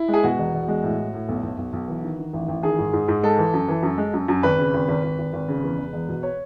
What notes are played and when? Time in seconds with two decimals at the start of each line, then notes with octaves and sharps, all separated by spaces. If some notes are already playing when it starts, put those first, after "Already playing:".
Already playing: E4
0.08 G#3
0.13 G#4
0.24 B2 F#4
0.38 E1
0.53 E1
0.68 G#3
0.83 A2
0.98 A2
1.13 A2
1.28 B1
1.43 B1
1.58 B1
1.73 B1
1.88 E3
2.03 D#3
2.19 D#3
2.33 A1
2.48 A1
2.63 D#3 G#4
2.78 G#2
2.93 G#2
3.08 G#2
3.23 G#3 A4
3.38 E3
3.53 F#2
3.68 E3
3.83 F#2
3.98 G#3
4.13 F#2
4.28 F#2
4.43 G#1 B4
4.58 C#3
4.74 G#1
4.88 G#1
5.04 G#1
5.19 G#1
5.33 G#1
5.48 C#3
5.63 E2
5.78 E1
5.93 E1
6.09 B2
6.23 C#5